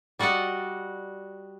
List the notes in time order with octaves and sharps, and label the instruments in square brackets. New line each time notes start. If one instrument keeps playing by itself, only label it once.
[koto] G3 F#4 D5 D#5 F#5